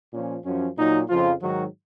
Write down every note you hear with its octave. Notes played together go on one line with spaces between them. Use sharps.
A#2 F3 C#4
F#2 F3 C#4
A#2 F#3 D#4
F2 C#3 F3 F4
G#2 D#3 F#3 F#4